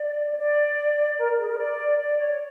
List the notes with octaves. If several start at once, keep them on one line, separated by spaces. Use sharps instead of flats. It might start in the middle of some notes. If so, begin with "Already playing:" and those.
Already playing: D5
C#5
D5
A#4
G#4
A#4
D5
D5
C#5